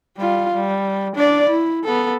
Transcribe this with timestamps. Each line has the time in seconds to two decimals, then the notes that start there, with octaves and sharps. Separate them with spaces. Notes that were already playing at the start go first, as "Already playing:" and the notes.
0.17 G3 F4
0.54 G3
1.16 D4 D5
1.49 E4
1.84 B3 A4